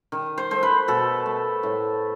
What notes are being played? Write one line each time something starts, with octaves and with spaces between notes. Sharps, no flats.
D#3
C5
A3 C5
B4
B2 A4
A3
A2